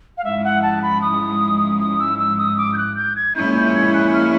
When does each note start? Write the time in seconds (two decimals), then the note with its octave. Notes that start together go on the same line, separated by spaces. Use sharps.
0.18 F5
0.25 G#2 F3 G#3 C#4 E4 E5
0.44 F#5
0.63 A5
0.82 B5
1.02 D#6
1.80 D#6
1.99 E6
2.19 E6
2.38 D#6
2.58 D6
2.73 G6
2.78 F#6
2.96 G6
3.16 G#6
3.36 A#2 F3 G#3 C#4 E4 G6
3.55 G6
3.75 G#6
3.93 F#6
4.13 F6